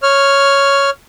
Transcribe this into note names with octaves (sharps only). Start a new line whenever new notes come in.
C#5 F6